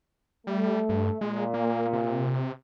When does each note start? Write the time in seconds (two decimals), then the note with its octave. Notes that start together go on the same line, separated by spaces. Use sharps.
0.47 G3 A3
0.89 G2
1.21 A#2 G#3
1.54 A#3
1.93 C3